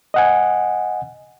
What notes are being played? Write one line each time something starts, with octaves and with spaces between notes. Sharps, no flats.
D#5 F#5 G#5